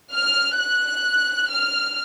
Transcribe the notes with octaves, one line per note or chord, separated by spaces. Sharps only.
F6
F#6
F6